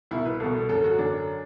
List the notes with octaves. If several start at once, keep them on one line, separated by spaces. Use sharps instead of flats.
C2 B2 E4
B4
C2 B2 A4
F#2 D3 A4
F#4
F#2 D3 D4